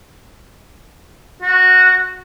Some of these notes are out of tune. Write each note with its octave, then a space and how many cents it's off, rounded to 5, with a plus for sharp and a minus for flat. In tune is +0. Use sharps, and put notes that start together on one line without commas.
F#4 -5